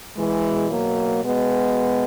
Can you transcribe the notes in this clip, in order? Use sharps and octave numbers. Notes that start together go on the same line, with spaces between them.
B2 E3 G#3
F#3 A#3
G#3 B3